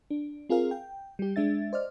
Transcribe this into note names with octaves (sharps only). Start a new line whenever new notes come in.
D4
C4 F4 G#4 A#4 F5
G5
G3 G4
G#3 D4 E5 A6
C5 D5 D#5 F6